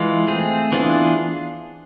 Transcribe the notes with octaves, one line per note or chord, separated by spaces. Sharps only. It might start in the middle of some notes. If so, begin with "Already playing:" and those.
Already playing: E3 G#3 F4
A3 C4 G#4
E3 B3 D4 F4 G#4